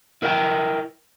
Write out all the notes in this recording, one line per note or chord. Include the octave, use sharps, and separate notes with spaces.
E4 A#4 B4 F#5 G5